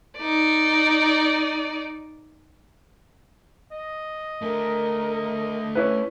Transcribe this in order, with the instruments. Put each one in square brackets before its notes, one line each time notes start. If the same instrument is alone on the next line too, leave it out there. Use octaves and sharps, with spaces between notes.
[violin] D#4 D5
[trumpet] D#5
[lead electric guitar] A3 D4 [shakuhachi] A#4
[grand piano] C#4 E4 B4